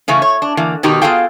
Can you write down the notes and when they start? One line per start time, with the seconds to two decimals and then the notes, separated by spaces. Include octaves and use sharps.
0.08 C#3 E3 A3 C#4
0.22 C#5
0.42 D4
0.57 D3 E3 A#3
0.83 B2 D#3 D#4 G4 A#5
1.02 B3 F4 G#4 A4 F5 G5